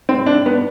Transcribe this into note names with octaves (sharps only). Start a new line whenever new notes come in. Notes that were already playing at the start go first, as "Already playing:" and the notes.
C4
D4
B3